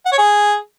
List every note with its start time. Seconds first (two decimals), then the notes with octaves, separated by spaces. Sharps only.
0.05 F#5
0.12 C#5
0.18 G#4